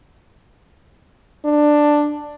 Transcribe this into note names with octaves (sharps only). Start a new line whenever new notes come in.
D4